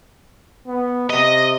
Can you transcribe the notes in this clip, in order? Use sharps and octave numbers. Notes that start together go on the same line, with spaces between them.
B3
C3 D#5